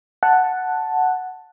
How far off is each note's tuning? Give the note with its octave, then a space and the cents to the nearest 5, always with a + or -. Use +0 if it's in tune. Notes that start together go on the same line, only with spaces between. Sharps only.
F#5 +0 A5 +0